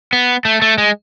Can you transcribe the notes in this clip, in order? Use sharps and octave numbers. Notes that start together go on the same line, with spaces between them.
B3
A3
A3
G#3